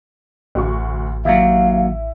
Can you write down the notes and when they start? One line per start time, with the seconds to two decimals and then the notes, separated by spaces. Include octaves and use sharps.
0.55 A1 D2 F#4 C#6
1.25 D#2 F#3 E4 F5